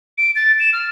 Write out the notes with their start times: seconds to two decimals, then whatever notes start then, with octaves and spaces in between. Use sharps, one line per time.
0.18 D7
0.36 A6
0.60 E7
0.73 F6